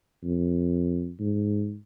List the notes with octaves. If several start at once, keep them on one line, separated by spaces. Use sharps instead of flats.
F2
G#2